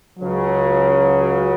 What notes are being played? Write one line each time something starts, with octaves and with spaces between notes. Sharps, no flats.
C#2 C#3 F#3